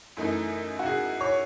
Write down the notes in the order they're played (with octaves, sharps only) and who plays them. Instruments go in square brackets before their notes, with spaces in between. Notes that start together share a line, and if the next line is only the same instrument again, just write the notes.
[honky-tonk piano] F#2 E3 A3 D#4
[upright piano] F#4
G#4
C#5